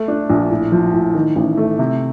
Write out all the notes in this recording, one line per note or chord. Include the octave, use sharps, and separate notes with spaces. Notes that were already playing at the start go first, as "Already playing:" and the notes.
Already playing: A3
D4
A#1
A2
F3
A2
D#3
A1
A3
C3